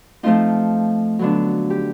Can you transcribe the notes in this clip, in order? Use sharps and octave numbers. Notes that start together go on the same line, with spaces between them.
F3 A3 C4 D#4 F4
D3 F#3 B3 D4
G4